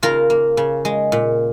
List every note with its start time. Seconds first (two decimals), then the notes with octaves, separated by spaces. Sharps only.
0.03 C#3 F4 A#4
0.30 A#3
0.57 C#3
0.85 G#3
1.12 A#2